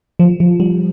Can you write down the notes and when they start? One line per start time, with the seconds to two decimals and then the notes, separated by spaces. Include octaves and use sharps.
0.19 F3
0.40 F3
0.60 G3